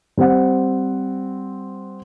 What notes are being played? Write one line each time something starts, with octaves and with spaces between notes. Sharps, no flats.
G3 C4 C5 F#5